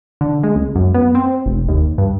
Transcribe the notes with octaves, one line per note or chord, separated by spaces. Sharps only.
D3
G#3
C#2
F#2
B3
C4
F1
D#2
G2